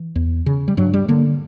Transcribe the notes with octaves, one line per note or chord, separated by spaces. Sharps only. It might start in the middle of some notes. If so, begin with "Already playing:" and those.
Already playing: E3
E2
C#3
G3
G2 F#3
G3
D3 A#3